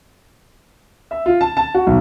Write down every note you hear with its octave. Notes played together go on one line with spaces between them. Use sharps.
E5
F4
A5
A5
F#4
B1